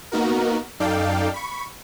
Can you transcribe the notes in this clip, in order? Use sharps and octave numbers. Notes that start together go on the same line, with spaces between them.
A#3 B3 D#4 F#4 A#4
F#2 D#4 A4 D5 F5 G5
B5 C#6